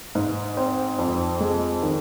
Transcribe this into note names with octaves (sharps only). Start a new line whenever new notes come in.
G#2
C4
F2
G#3
D#3